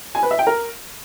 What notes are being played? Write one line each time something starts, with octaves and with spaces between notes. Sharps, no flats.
G#5
B4
E5
G5
A#4